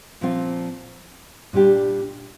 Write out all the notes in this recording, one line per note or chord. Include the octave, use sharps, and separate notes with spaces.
A#2 F3 C4 F4
A#2 G3 D4 G4